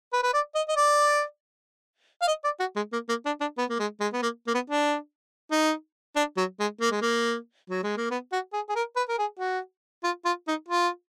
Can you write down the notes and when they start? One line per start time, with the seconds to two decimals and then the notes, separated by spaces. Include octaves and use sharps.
0.13 B4
0.23 B4
0.33 D5
0.55 D#5
0.68 D#5
0.76 D5
2.22 F5
2.27 D#5
2.44 D5
2.60 F#4
2.76 G#3
2.92 A#3
3.09 A#3
3.26 D4
3.41 D4
3.58 B3
3.70 A#3
3.79 G#3
4.00 G#3
4.13 B3
4.23 A#3
4.47 A#3
4.54 B3
4.70 D4
5.52 D#4
6.16 D4
6.37 F#3
6.60 G#3
6.81 A#3
6.91 G#3
7.02 A#3
7.70 F#3
7.83 G#3
7.97 A#3
8.11 B3
8.32 F#4
8.53 G#4
8.69 G#4
8.75 A#4
8.96 B4
9.09 A#4
9.18 G#4
9.39 F#4
10.04 F4
10.25 F4
10.48 D#4
10.68 F4